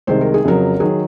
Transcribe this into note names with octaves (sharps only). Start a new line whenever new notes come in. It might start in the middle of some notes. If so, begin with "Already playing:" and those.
C2 C3 D#3 G#3 C5
A#4
G#4
F2 C#3 F#3 A#4
D#3 F#3 G#4